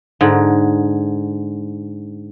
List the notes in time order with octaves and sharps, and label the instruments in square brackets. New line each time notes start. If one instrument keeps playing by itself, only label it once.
[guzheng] G#2 D3